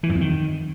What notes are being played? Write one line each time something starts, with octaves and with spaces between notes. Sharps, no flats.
E3
F#2
F2
D#3